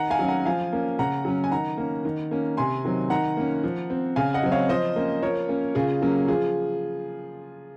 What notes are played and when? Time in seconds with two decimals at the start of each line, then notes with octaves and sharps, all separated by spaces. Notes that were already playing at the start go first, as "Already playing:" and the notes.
Already playing: D#3 F#5 A#5
0.10 F5 G#5
0.19 F#3 C#4
0.28 F#5 A#5
0.46 F3 F5 G#5
0.73 A#3 C#4
0.99 C#3 F#5 A#5
1.25 F#3 C#4
1.44 G#5
1.51 D#3 F#5 A#5
1.78 A#3 C#4
2.05 D#3
2.31 A#3 C#4
2.57 C3 G#5 C6
2.85 D#3 F#3 C4
3.10 D#3 F#5 A#5
3.37 A#3 C#4
3.64 F3
3.90 C4
4.16 C#3 F5 G#5
4.34 D#5 F#5
4.43 F#3 C4
4.52 C#5 F5
4.69 F3 C5 D#5
4.96 A#3 C#4
5.22 F3 A#4 C#5
5.48 A#3 C#4
5.75 C#3 F4 G#4
6.02 F#3 A#3 C#4
6.28 F3 F4 G#4